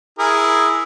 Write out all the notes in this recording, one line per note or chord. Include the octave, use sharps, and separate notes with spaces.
E4 G#4 A#4